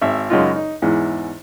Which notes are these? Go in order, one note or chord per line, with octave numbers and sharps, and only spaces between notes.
G#1 E5
F#2 C#3 G#3 D#4 F4
D#4
E2 G#2 E3